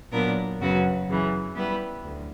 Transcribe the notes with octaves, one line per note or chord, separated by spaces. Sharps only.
A#2 F#3 B3 D4 A#4
F#2 C#3 F#3 B3 F#4
F#2 C#3 E3
G3 B3 E4 G4 B4
D2